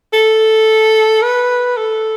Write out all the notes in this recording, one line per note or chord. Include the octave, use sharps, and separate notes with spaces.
A4
B4
A4